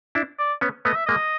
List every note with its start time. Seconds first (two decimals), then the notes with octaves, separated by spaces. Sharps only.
0.15 D4 E4
0.39 D5
0.61 B3 C#4
0.85 A3 B3 D#5
0.95 E5
1.06 G#3 A#3 D#5